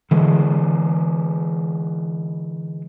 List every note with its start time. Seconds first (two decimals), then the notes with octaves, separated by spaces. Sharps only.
0.11 D3 E3 G#3